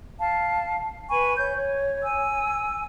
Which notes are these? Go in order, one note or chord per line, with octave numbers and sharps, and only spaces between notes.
F5 A5
B4 G#5 B5 C#6
C#5 G6
C#5
G#5 E6